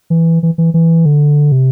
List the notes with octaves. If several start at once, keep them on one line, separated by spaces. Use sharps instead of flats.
E3
E3
E3
E3
D3
C3